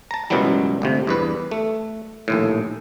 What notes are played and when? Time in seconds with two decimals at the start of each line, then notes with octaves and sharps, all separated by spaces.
0.11 A5 A#5
0.30 C#2 F#2 B2 E3 F#3 G3
0.82 G1 D2 C3
1.07 E2 G2 B4
1.51 A3
2.28 A#1 D#2 A2